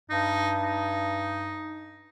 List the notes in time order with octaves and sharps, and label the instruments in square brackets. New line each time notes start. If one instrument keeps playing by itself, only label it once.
[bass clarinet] G2 [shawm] D#4
[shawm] D#4